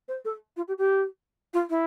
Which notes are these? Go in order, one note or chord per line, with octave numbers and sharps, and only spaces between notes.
C5
A4
F4
G4
G4
F4
E4